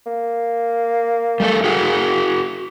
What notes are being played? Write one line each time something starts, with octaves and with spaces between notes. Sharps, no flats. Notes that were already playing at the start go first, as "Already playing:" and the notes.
A#3
G3 A3 A4
F#4 G#4 A#4